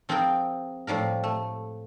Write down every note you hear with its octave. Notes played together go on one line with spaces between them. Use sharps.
F3 C4 F4 G#4 A#4 G5
A2 F3 G3 A#4
A3